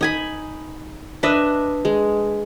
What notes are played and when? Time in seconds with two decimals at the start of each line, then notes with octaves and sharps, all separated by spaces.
0.01 D#4 G#5 B5
1.23 D4 B4 D#5 E5
1.85 G#3